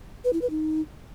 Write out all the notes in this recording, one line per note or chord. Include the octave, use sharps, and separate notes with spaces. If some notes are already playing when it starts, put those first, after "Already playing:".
B4
E4
B4
D#4